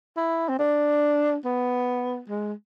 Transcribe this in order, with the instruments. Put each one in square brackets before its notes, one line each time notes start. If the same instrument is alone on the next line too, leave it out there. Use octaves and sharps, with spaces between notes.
[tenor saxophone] E4
C4
D4
B3
G#3